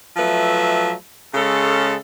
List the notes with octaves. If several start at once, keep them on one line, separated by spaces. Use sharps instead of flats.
F3 F#3 A3 B4 E5
C#3 G#3 C#4 A4